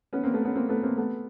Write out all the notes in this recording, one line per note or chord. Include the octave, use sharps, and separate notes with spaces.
B3 C#4
A#3 C4
A3 B3
B3 C#4
A#3 C4
A3 B3
A#3 C4
A3 B3